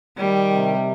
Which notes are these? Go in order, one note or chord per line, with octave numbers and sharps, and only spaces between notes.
D#3 G3
C3